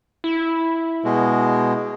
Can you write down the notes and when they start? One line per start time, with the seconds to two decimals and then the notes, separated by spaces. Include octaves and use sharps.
0.24 E4
1.05 B2 G#3